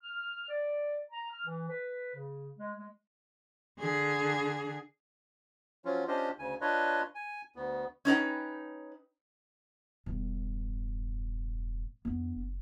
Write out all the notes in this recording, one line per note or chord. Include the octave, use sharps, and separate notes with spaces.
F6
D5
A#5
F6
E3
B4
C#3
G#3
G#3
D3 G#4
F3 F#3 C#4 F4
C#4 D4 F4 G4 C5 D#5
D2 C#3 G#5
D4 F4 B4 C#5 D#5
G#5
D2 B3
C#4 D#4 B4 G5
E1 G2 B2
F2 B3 D4
F#1